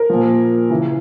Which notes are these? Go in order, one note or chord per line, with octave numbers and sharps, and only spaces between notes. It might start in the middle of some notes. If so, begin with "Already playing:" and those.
Already playing: A#4
A#2 F3
C#3 E3